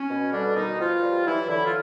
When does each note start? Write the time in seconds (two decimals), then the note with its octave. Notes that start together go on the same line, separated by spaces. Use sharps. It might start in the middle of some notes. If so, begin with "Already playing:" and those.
Already playing: C#4
0.09 B2
0.32 D3 G3 D4
0.56 B2 D#3 D#4
0.78 B2 F3 F4
1.03 G3
1.25 E3 F#3 E4
1.48 D3 E3 E4
1.65 F4